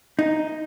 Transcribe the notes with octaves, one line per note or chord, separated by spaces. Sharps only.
D#4